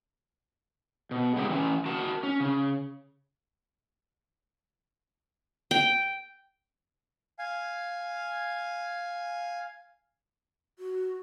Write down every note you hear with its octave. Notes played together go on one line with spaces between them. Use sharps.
B2
C#3 G#3 D#4 E4 G4
E3 C#4
F#4 A#4 F#5 A5
C#4
C#3
G5
F5 G#5
F#4